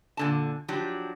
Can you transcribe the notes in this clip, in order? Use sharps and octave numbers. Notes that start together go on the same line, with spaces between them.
A#2 D3 A5
F3 F#3 D4 G4